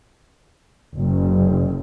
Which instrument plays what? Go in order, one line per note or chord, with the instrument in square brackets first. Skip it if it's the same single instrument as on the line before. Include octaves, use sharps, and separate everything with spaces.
[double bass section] F#1